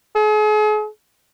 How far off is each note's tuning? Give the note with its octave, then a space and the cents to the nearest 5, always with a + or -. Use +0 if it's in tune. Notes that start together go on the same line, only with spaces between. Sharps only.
G#4 +40